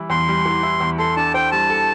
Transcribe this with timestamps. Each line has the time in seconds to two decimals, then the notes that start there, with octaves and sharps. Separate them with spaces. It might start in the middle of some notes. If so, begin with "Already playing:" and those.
Already playing: E3 G3 E4
0.10 E2 C6
0.29 G3
0.45 E3
0.63 E4
0.80 E2
0.98 A4 C6
1.17 D4 A5
1.34 C5 G5
1.51 G3 A5
1.69 A4